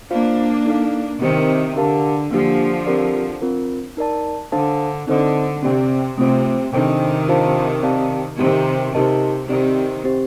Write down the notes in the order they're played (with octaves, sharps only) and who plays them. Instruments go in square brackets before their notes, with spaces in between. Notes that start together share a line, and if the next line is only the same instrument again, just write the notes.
[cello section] A#3 D4 [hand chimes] F4 C5 F5
[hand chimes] D#4 A4 D5 F5
[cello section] C3 D#3 [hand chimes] C4 G4 C5 G5
[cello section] D3 [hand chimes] G4 A#4 F5 A5
[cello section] D3 F3 [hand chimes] A#3 D4 G4
[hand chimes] C4 G4 A#4 D5
C4 F4 A#4
D#4 A#4 D5 A5
[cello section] D3 [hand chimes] D4 A4 C5 F5 A5
[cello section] D3 [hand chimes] C4 D#4 A4 C5 D#5
[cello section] C3 [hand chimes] C4 G4 D5 G5
[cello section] C3 [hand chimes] A3 C4 F4 C5
[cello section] C3 D#3 [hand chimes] D4 A4 C5 G5
[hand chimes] D4 F4 C5 F5 A5
C4 G4 D5 F5 A5
[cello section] C3 D#3 [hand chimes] C4 D#4 G4
[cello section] C3 [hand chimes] D#4 G4 A#4 D#5 A5
[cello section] C3 D#3 [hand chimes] C4 G4 D5
[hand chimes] C4 G4 C5